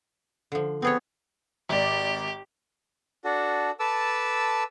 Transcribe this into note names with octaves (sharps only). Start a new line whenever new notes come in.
D3 F3
B3 C4 G#4 C#5
G#1 G4 D5
D4 F#4 A4
A4 B4 A5 D6 E6